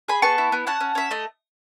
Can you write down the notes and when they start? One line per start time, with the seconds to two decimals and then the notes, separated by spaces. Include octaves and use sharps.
0.08 G#4 G#5 B5
0.22 B3 A5 C#6
0.38 E4
0.52 B3
0.67 C#4 F#5 A5
0.81 C#4
0.95 C#4 E5
1.11 A3 D#5